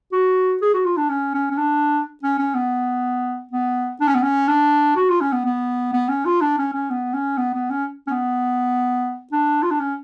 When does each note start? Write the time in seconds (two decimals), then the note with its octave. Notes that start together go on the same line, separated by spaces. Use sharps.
0.12 F#4
0.62 G#4
0.74 F#4
0.85 F4
0.97 D4
1.10 C#4
1.34 C#4
1.51 C#4
1.57 D4
2.23 C#4
2.38 C#4
2.55 B3
3.52 B3
4.00 D4
4.08 C#4
4.15 B3
4.23 C#4
4.48 D4
4.96 F#4
5.09 F4
5.21 C#4
5.33 B3
5.46 B3
5.93 B3
6.09 C#4
6.25 F4
6.41 D4
6.58 C#4
6.73 C#4
6.90 B3
7.14 C#4
7.38 B3
7.54 B3
7.70 C#4
8.07 C#4
8.11 B3
9.32 D4
9.62 F4
9.71 D4
9.80 C#4